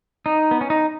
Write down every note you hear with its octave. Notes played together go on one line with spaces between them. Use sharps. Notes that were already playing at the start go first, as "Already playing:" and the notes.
D#4
B3
C#4
D#4